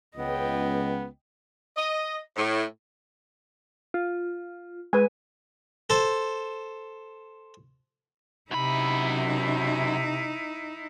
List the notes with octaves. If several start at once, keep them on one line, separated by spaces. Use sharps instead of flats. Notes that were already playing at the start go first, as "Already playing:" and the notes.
C#2 B3 D#5 G5
D#5
A2
F4
G#3 B4 G#5
A4 C5
F#2 C3 D#4 E4 B5